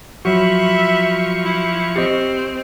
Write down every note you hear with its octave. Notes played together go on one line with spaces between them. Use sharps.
F3 F#3 F#4 E5 B5 C#6
E4
C4 G4 D#5